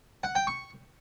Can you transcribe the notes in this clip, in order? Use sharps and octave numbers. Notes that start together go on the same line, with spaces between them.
F#5
G5
C#6